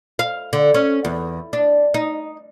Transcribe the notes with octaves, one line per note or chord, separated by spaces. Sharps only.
F5
D3
C#4
E2
D4
D#4